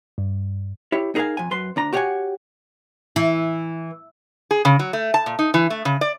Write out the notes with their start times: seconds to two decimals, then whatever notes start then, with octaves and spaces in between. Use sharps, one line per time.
0.18 G2
0.92 E4 G4 C#5
1.15 D#4 G#4 A#4 C5 F5 G#5
1.37 F2 G#5
1.51 F#2 B4 C6
1.76 D2 D4 A#5
1.93 F#4 G4 C#5 F5 F#5 G#5
3.16 E3
4.51 G#4
4.65 C#3
4.79 F#3
4.93 A3
5.14 A5
5.26 A#2
5.39 D#4
5.54 E3
5.70 A3
5.85 C#3
6.01 D5